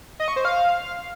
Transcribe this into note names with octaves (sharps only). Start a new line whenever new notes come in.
D#5
C#6
C5
F5